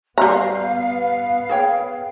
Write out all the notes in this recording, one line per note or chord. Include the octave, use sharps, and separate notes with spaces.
G3 B3 F5 A#5
G#4 C#5 G5